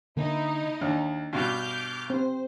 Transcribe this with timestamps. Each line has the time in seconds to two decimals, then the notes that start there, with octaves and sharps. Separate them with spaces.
0.17 D3 A#3 D#4 E4 D#5
0.81 D#2 D4
1.33 G2 B2 D6 F6 G6
2.10 C4 C5